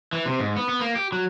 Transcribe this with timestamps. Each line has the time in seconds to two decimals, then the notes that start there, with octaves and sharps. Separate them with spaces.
0.13 E3
0.25 C3
0.40 G#2
0.56 B3
0.69 B3
0.81 A#3
0.96 G4
1.12 F#3